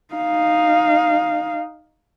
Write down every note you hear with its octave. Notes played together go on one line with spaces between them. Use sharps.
D#4 F5